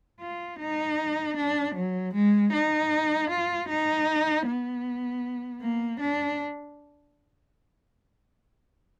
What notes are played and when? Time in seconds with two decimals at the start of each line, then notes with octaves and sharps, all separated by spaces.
0.20 F4
0.59 D#4
1.37 D4
1.75 F#3
2.14 G#3
2.53 D#4
3.30 F4
3.69 D#4
4.46 B3
5.62 A#3
6.00 D4